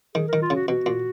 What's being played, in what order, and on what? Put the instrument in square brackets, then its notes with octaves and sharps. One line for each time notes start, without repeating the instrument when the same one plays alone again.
[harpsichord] D#3 [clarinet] G#4
[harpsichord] D#3 [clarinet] A#4
[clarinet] F4
[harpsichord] C#3 [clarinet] F#4
[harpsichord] B2 [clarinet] F#4
[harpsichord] A#2